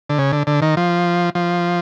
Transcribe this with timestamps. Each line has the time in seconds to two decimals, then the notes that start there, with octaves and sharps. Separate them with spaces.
0.10 D3
0.19 C#3
0.33 D3
0.47 D3
0.62 D#3
0.77 F3
1.35 F3